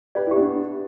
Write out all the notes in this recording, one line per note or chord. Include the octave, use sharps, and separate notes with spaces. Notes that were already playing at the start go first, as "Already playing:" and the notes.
G4 B4 D5
E4 G4
B3 D4